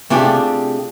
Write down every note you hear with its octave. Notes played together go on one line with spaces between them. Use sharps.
C3 A3 D4 F4 G4 G#4